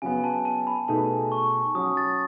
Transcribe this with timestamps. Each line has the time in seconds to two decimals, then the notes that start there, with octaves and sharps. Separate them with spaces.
0.02 C#3 F#3 B3 G#5
0.24 A5
0.45 A5
0.67 B5
0.88 B2 A3 D#4 G#4 B4 A5
1.32 C#6
1.75 F#3 C#4 F#4 D#6
1.97 A6